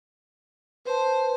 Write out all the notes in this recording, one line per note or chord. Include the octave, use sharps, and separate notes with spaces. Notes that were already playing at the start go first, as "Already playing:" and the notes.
B4 C5 A5